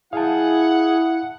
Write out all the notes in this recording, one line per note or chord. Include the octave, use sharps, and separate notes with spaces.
E4 G#4 F5 F#5 A5